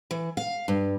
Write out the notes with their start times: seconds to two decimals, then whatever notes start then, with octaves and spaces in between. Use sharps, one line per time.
0.11 E3
0.37 F5
0.68 G2